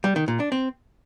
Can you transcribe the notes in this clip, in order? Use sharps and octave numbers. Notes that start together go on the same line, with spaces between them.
G3
D#3
A#2
D4
C4